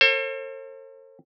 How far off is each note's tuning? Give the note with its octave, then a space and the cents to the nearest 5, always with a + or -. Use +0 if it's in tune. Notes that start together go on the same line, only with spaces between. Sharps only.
A4 +45 C5 +45